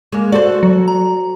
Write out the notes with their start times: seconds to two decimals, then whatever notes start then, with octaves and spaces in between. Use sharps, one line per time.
0.12 G#3 A#3
0.32 F#4 A4 C5 D5
0.63 F#3
0.88 A#5